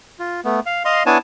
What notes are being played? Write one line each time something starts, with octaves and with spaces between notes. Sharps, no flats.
F4
A3 B3
F5
D#5 F5 C6
B3 D4 E4 C#5 G#5 A5